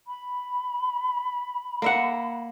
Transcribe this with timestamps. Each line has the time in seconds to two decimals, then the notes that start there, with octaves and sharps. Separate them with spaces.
0.07 B5
1.82 A#3 E5 F#5